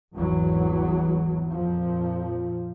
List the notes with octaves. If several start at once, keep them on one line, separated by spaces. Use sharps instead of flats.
G#1 E2 E3 F#3
F2 A#2 F3